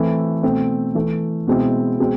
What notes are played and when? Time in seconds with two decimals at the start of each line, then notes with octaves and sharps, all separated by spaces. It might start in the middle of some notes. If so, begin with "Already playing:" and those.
Already playing: E3 A3 C4 E4
0.43 B2 A3 C4
0.95 E3 A3 E4
1.47 B2 G#3 C4 E4
2.00 B2 G#3 C4